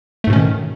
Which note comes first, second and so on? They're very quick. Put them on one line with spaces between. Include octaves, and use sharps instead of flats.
A3 G#2 B2 C#4 D#3